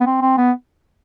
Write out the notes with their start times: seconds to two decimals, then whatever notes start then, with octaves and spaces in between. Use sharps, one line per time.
0.01 B3
0.06 C4
0.22 C4
0.38 B3